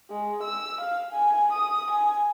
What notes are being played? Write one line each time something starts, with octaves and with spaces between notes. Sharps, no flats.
G#3
E6
F5
G#5
D#6
G#5